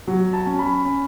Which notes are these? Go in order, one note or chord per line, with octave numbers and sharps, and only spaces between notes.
F#3
A5
C#4
B5
C#4